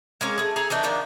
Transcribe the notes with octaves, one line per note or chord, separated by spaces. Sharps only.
G#3 A#3 C#4
A3 G#4
G#4 A4 A#5
E3 A3 D4 D#4
D#3 F3 A#3 D4